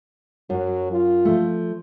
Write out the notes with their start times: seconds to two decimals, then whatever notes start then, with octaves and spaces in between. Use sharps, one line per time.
0.50 F#2 F#3
0.92 F4
1.25 F3 A3